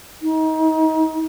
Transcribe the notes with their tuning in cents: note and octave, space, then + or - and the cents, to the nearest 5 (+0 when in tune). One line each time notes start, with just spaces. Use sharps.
D#4 +30